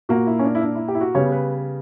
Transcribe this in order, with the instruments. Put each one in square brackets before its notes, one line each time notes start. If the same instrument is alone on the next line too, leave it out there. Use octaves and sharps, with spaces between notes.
[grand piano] A#2 A#3 F#4
E4
C#4
D4
E4
D4
E4
G4
E4
F#4
C#3 G3 B3 C#5
B4